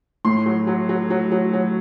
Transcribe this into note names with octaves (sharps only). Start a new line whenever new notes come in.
A2 C6
F#3
F#3
F#3
F#3
F#3
F#3